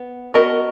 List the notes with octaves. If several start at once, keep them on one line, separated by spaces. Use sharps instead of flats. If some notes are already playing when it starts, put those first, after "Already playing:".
Already playing: B3
B3 F#4 A#4 D#5